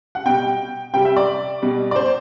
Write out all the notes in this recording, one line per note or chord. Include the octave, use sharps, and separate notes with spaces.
F#5
B2 G3 G5
C3 G3 G5
E5
D5
B2 G3
D5
C5